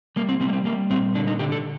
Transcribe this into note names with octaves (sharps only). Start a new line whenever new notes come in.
G3 A#3
C4
G3 C4
A#3
C4
G3 A#3
A#2 C4
D3 D4
D#4
D3 G4
A4